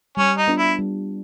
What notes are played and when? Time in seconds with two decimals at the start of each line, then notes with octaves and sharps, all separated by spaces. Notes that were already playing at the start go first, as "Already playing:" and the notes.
0.17 G3 C#4
0.38 D#4
0.48 B3 D4 F4
0.59 E4
0.79 G3